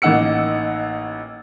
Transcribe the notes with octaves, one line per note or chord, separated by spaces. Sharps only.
A1 A#3 D#4 F#5 E6 C#7